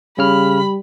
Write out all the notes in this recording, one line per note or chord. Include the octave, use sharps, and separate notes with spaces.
C#3 G3 B5 F6